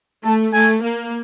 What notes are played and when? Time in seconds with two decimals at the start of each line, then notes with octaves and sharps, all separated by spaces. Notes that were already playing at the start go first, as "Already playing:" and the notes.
0.25 A3 A5
0.53 A3 G#5
0.82 A#3